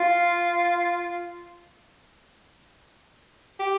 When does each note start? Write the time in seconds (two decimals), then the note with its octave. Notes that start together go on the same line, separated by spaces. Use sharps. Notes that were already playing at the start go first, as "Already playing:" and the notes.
Already playing: F4
3.60 G4